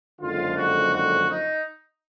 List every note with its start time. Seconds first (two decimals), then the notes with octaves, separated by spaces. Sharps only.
0.20 F#1 F2 D3 F3 G#3 F4
0.57 F#4
0.93 F#4
1.30 D#4